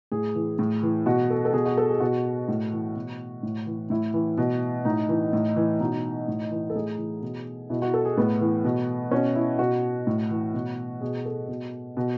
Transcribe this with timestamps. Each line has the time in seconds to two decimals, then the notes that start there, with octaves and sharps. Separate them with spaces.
0.12 A2 G#4
0.35 E3
0.59 A2
0.83 E3
1.06 B2 F#4
1.30 A4
1.45 A4
1.53 B2 G#4
1.65 F#4
1.77 A4
1.89 G#4
2.00 B2 F#4
2.48 A2
2.72 E3
2.96 B2
3.43 A2
3.66 E3
3.90 A2 E4
4.14 E3
4.38 B2
4.85 A2 D#4
5.09 E3
5.33 A2
5.56 E3
5.80 B2 D#4
6.28 A2
6.51 E3
6.70 A4
6.76 A2 G#4
6.98 E3
7.22 B2
7.69 B2 E4
7.82 F#4
7.94 A4
8.05 G#4
8.17 A2 B3
8.41 E3
8.64 B2
9.11 B2 C#4
9.35 E4
9.59 B2 F#4
10.07 A2
10.31 E3
10.54 B2
11.01 B2 G#4
11.25 A4
11.48 B2
11.97 B2